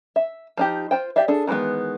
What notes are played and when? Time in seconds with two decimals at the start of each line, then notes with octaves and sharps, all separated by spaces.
0.16 E5
0.57 F3 D#4 G4
0.91 F4 C5 G5
1.16 G4 D5 E5 F5
1.28 D4 G#4 A4
1.47 D#3 E3 G3 G#3 B3